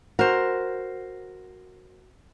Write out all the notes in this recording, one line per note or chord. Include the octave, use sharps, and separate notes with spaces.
F#4 A#4 C5